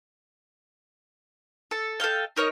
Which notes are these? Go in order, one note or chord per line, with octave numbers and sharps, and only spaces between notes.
A4
A4 D#5 F5 G5
D#4 A#4 C#5 D#5